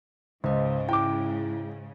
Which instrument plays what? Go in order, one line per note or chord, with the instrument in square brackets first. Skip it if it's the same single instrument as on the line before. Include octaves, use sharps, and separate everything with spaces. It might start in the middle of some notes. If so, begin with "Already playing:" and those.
[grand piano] C#2 [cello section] G#2 C#3 [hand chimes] C5 D#5
[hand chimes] E4 [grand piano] G5 D6